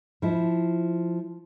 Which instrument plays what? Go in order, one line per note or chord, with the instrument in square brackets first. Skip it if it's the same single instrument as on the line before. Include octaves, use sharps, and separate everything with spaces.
[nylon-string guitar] F3 E4